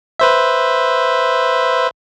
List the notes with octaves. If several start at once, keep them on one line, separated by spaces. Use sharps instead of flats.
B4 C5 E5